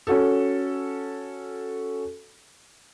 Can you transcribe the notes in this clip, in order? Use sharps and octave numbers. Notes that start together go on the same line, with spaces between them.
C#4 F#4 A4